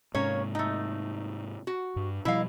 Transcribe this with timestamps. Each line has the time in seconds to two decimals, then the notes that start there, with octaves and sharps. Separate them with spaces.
0.15 G#2 C3 A#3 C#4 C#5
0.55 A3 D#4
1.67 F#4
1.96 G2
2.25 B2 F3 G3 E4 D#5 F5